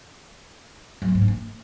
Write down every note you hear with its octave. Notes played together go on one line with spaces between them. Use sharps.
F#3
B3
G#2
D4
A#3